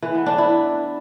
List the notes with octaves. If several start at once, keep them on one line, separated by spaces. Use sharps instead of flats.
E3
B3
D4
E4